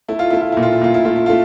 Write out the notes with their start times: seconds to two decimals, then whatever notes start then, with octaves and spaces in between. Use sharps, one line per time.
0.09 A3 E4
0.19 F4
0.30 A3 E4
0.41 F4
0.52 A#2 E4
0.63 F4
0.72 E4
0.81 A#2 F4
0.94 E4
1.05 A3 F4
1.16 E4
1.26 A3 F4